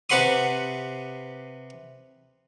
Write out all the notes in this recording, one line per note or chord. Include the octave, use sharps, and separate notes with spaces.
C3 G4 B4 F#5 C6 D#6